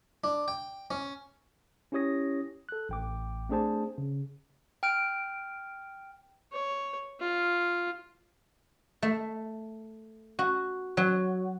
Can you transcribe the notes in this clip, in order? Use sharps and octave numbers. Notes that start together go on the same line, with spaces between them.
D4
G5
C#4
C#4 E4 G4 C#5 D#6 A#6
A4 F#6
A1 G5 D6
A3 C4 D4 G#4 C5 A5
C#3
G5 F6 D7
C#5
F4
A3
F#4
F#3